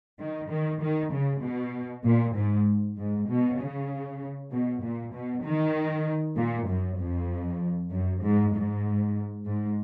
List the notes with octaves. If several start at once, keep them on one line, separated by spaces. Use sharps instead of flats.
D#3
D#3
D#3
C#3
B2
A#2
G#2
G#2
B2
C#3
B2
A#2
B2
D#3
A#2
F#2
F2
F#2
G#2
G#2
G#2